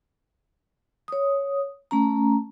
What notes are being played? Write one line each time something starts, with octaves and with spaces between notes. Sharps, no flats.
C#5 D#6
A3 C#4 A#5